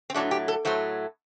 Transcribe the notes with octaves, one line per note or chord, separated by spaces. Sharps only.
C4
A2 F#3 A3 D4
G4
A4
A2 F#3 A3 C5